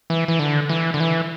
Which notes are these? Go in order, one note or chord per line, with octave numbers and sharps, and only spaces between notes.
E3
E3
D3
E3
D3
E3